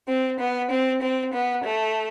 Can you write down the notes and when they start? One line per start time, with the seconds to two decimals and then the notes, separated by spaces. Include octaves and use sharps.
0.08 C4
0.40 B3
0.70 C4
1.02 C4
1.33 B3
1.64 A3